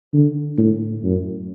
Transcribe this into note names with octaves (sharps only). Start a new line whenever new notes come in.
D3
A2
F#2